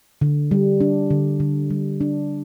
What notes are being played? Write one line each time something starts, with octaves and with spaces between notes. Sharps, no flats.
D3
G3
D4
D3
D3
G3
D4